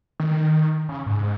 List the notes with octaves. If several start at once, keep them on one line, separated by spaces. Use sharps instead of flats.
D#3
C#3
G#2